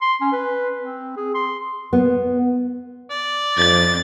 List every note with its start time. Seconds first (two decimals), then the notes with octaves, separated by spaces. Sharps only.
0.02 C6
0.21 C#4
0.32 B4
0.78 C4
1.17 G#4
1.34 C6
1.93 B3
3.10 D5
3.57 F2 A6